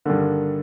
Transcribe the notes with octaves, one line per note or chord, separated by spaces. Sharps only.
G2 D3 D#3 A#3